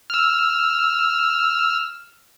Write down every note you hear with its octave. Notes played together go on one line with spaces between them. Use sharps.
E6 F6